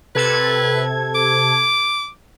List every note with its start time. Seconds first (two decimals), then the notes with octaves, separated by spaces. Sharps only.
0.15 C3 A4 B4 G#6
1.14 D6